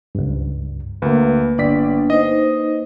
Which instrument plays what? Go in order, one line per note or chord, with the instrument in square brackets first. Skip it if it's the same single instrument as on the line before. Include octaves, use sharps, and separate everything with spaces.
[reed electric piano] C#2 G2
[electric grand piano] D2 [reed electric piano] A#3 B4
[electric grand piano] G1 D5 B6 [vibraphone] D4
[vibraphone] D#4 C5 [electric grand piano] D#5